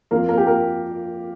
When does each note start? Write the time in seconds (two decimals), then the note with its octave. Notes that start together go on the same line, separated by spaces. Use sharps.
0.11 F2 F3 A#3 A#4
0.29 A#3 A#4
0.38 G4
0.46 A#3 A#4